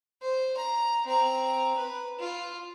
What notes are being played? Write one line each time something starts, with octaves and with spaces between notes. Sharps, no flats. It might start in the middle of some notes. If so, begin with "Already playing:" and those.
C5
A#5
C4 A#5
B4
F4